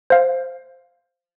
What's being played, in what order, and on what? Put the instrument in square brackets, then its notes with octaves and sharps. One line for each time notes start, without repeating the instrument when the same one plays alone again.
[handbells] C5 F5